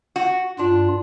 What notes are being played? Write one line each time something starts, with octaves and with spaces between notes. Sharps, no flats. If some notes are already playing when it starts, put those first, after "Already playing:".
F#4
G2 D4 F4